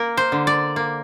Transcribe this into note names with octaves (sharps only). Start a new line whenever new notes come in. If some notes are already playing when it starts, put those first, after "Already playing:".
Already playing: A#3 A#4
C5
D3
D5
A#3